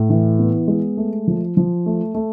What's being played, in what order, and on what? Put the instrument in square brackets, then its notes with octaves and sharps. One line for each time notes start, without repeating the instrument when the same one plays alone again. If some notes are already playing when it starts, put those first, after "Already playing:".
Already playing: [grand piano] A2
E3
B3
G#3
A3
F3
F3
A3
A3